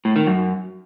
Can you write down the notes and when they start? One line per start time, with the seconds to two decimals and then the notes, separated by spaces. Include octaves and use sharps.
0.05 A2
0.16 D#3
0.27 F#2